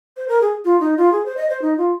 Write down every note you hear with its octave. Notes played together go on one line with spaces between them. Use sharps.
C5
A#4
G#4
F4
D#4
F4
G#4
C5
D#5
C5
D#4
F4